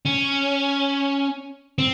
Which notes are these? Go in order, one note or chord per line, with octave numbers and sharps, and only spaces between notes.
C#4
C4